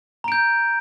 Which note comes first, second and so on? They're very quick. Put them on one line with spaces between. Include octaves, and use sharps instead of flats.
A#5 D7 G6